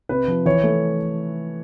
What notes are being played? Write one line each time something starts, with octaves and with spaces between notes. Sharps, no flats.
C3 B4
F3
E3 C#5
A3